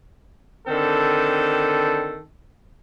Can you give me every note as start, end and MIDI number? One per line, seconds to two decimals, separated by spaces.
0.67 2.18 50
0.67 2.18 51
0.67 2.18 60
0.67 2.18 69